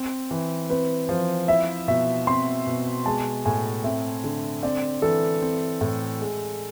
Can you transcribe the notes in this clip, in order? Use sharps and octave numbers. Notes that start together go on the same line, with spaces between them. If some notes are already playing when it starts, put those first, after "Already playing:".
Already playing: C4
E3
C4 B4
F3 C5
E4 E5
B2 E5
C4 C6
B2
G#3 A5
A2 G#5
C4 E5
D3
C4 D5
E3 A4
C4
A2
G#3